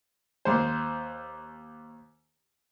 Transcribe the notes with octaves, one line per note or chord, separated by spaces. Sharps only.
D#2 C5